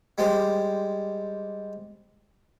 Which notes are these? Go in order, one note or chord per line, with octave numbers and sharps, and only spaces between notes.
G3 G#3 G4 C5 D5